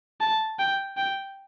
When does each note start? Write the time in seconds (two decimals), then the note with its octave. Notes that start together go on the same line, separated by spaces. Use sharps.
0.20 A5
0.59 G5
0.97 G5